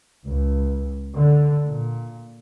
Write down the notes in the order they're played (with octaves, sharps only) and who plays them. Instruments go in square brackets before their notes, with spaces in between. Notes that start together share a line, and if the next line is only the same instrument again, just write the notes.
[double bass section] C#2
D3
A#2